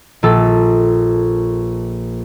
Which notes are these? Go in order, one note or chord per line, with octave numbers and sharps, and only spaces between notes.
A#1 A4